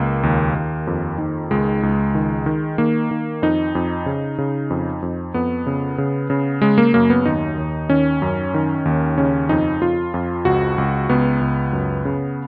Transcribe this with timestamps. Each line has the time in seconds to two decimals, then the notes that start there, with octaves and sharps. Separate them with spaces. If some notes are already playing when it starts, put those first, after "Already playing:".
Already playing: C#2 A#3
0.23 D#2
0.55 D#2
0.87 F2
1.18 D#3
1.51 C#2 G#3
1.83 C#2
2.15 D#3
2.46 D#3
2.78 D#3 A#3
3.11 D#3
3.42 F2 D#4
3.75 F2
4.06 C#3
4.38 C#3
4.70 F2
5.02 F2
5.34 F2 B3
5.66 C#3
5.98 C#3
6.30 C#3
6.62 C#3 G#3
6.78 A#3
6.94 F#2 A#3
7.10 B3
7.26 D#2 D#4
7.58 D#2
7.89 D#3 C#4
8.22 F#2
8.54 D#3
8.85 D#2
9.18 C#3 C#4
9.49 F2 D#4
9.81 F2 F4
10.14 F2
10.45 C#2 F#4
10.78 C#2
11.09 C#2 B3
11.41 C#2
11.73 F#2
12.05 C#3